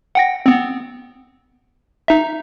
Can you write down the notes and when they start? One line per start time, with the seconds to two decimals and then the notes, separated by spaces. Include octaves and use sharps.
0.15 F#5 G5 A#6
0.46 B3 C4
2.08 D#4 E5